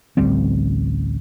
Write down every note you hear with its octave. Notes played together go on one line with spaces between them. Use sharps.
A1 D2 G3 C4